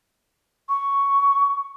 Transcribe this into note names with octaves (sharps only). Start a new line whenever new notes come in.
C#6